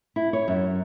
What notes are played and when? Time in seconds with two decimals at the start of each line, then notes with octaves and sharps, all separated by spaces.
0.16 E4
0.33 C#5
0.48 F#2